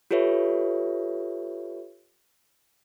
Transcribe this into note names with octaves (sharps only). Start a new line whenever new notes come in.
F4 G4 A4 B4 C#5 E5